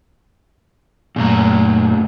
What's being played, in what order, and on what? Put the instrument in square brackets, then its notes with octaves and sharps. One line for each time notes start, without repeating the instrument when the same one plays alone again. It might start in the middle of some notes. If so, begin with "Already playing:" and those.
[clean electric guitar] F#2 A#2 [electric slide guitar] C#3 A3 A#5